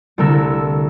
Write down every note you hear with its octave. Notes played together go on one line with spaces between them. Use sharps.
C2 D3 A3 A4 A#4 E6